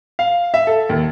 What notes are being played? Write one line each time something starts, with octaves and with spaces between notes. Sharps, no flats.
F5
E5
A4
D#2